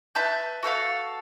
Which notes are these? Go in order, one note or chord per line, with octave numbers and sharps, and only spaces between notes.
B4 E5 A5 G6
F#4 A4 C5 F5